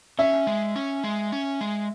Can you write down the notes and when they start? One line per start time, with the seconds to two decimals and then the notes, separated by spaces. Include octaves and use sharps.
0.19 C#4 E5
0.47 G#3
0.76 C#4
1.04 G#3
1.32 C#4
1.61 G#3